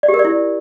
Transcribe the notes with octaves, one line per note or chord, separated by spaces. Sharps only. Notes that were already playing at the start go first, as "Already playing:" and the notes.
D5
G4
A#4
D5
E4